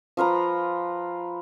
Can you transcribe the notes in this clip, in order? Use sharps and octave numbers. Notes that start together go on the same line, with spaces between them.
F3 F4 B4 A#5